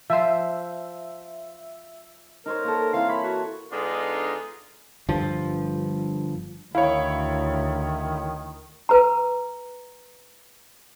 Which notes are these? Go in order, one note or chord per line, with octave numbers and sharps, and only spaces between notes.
F3 C5 E5
D#4 A#4 C5 C#5
A#3 A4
E3 C4 E4 F5
C#5 B5
F#4
D3 G#3 B3 D4 D#4 F4
G1 G2 F3
D2 D#3 E4 C#5 F5 B5
A#4 B4 A#5